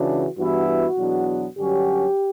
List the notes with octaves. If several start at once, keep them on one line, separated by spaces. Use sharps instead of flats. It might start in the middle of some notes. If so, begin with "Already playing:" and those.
Already playing: C#2 C#3 E3 D4 F#4
G2 E3 B3 E4 F#4
F#4
E2 B2 F#3 B3 D4
G2 D3 F#3 C#4 F#4 G4